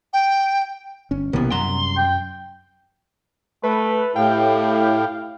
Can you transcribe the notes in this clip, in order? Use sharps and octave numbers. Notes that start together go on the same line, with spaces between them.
G5
G1 C#4
B1 C3 E3 A#3 B3
C2 F#2 F#5 A#5 C6
G5
A3 B4
A2 E4 G4 F5 G5